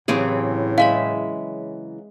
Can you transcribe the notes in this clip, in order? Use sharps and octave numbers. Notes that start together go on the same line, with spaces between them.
A2 C#3 E3 F#3 C4 G4 G#4
G#3 E5 F5 B5